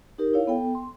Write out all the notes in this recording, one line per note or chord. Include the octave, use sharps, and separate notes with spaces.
D#4 G4 A#4
E4 C#5 F5
B3 A4 G5
C6